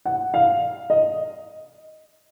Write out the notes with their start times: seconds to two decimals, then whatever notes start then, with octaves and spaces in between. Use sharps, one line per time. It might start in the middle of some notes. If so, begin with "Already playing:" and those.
0.05 F#5
0.34 F5
0.90 D#5